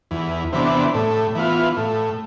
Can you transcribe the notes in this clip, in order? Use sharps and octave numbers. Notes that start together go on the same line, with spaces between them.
E2
C3 E3 B3 D4
A2
E3 B3 F4
A2